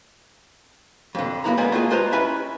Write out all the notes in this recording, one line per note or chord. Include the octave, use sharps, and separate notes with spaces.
F2 D3
F#2 C#3 A#3 B3 E4 A#5
D3 G3 G#3 A#3 B3 G#5
A3 A#3 F4 G#4
G#3 F4 B4 C5 A5 A#5
C#4 E4 B4 E5 G#5